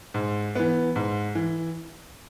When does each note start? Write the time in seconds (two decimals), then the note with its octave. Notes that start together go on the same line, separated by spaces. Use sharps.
0.14 G#2
0.55 E3 B3
0.96 G#2
1.35 E3